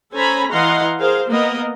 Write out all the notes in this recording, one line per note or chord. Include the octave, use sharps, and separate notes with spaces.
C#4 A4 C5 G#5 A#5 B5
E3 D#5 F5 F#5 A#5 C6
G#4 A#4 C5 F5
A#3 B3 A#4 D#5